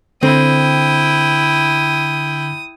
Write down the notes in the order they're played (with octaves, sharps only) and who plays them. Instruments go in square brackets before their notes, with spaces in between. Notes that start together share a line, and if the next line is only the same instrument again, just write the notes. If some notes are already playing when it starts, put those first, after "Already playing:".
[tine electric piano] D3 [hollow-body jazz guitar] C4 [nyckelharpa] E4 G5 [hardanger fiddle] D#6